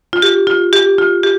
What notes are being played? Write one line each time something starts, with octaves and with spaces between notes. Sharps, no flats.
F4
G4
F4
G4
F4
G4